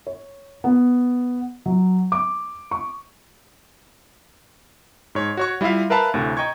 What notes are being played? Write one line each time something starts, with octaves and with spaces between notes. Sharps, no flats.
C#5
B3
F#3
D6
C#6
G#2 C#5
F#4 C#5 C#6
G3 E4 F4 E5 F5
A#4 B4 E5 F5 A5 B5
D2 A2 C3
D#5 G5 A#5 C#6 G#6